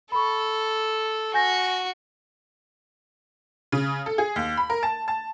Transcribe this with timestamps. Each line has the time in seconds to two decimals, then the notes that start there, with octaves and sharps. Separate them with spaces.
0.12 A4 B5 C#6
1.34 F#4 G#5 G6 A#6
3.72 C#3
4.06 A4
4.18 G#4
4.36 D#2
4.57 B5
4.70 A#4
4.83 A5
5.08 A5